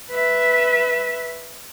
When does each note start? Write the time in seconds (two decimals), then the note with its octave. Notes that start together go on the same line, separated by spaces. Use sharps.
0.11 B4 E5